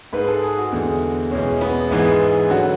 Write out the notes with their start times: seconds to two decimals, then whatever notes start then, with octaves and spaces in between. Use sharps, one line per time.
0.13 G#2 G#3 B4
0.28 A4
0.43 G#4
0.57 F#4
0.72 E2 D3 G#3
1.31 E2 B2 G#3 C#4
1.61 B3
1.91 G#2 E3 G#3 B3
2.50 D3 F#3 F#4